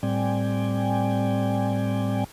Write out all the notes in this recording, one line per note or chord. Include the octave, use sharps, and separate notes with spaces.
A2 G3 C4 D5 G5 G#5